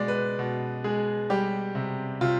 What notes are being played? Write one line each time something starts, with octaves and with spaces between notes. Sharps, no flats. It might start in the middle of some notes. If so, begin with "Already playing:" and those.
Already playing: B2 G#3 D5
B4
B2
G#3 G#4
G3 G4
C3
C3 F4